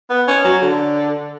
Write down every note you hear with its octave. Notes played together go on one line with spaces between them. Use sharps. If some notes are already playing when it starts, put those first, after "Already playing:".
B3
C#4
F#3
D3